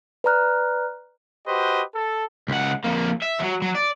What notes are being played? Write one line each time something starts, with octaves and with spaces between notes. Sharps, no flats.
B4 D5 A#5 F6 F#6
F#4 G4 B4 C5 D#5
A4
C#2 F#5
F2 A#3
E5
F3 F#3
F#3
D5